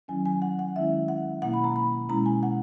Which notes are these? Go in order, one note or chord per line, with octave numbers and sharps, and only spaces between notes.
D#3 F#3 C#4 E4 G#5
G#5
F#5
F#5
D#3 G#3 C#4 E4 E5
F#5
B2 A#3 E4 F#5
B5
A#5
B5
B2 G#3 C#4 E4 A#5
G#5
F#5